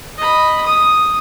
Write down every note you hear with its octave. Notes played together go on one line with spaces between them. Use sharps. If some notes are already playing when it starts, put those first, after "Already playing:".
D#5 B5
D#6